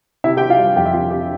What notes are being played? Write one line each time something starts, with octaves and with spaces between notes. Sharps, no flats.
C3 E4 E5
G4 G5
C4
F4 F5
G3
F2 G4 G5
E5
C3 F4 F5
C4 G4